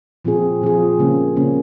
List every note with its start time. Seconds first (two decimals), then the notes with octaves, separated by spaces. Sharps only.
0.25 A#2 F3 C4 F4 G#4
0.61 A#2 F3 C4 F4 G#4
0.99 C#3 G3 A#3 C#4
1.36 C#3 G3 A#3 C#4